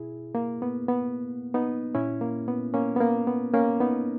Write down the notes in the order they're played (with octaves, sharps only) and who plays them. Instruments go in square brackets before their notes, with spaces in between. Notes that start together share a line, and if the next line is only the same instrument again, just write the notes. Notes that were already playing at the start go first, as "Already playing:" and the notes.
Already playing: [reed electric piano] B2 E4 G#4
A#3
B3
B3
B3 D#4
A#2 C#4 E4
A#3
B3
A#3 C#4
B3
A#3
B3
A#3 C#4
B3 D#4